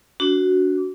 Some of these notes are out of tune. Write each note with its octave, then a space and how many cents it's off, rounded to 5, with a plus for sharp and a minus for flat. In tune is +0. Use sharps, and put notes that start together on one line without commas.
D4 -25 F#4 +0